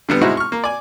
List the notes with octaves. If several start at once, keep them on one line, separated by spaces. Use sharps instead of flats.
D3 G3 B3
B2 G#3 C4 D#4 E4 F#4
C#6 F6
A#3
D5 G#5